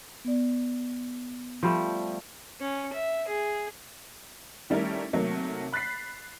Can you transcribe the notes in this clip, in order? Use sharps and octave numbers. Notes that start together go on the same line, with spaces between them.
B3 D5
F3 G3 A3
C#4
E5
G#4
D#3 G3 A3 C#4 E4 A#4
C3 D#3 F#3 A3 A#3
B5 F#6 A6 B6 C7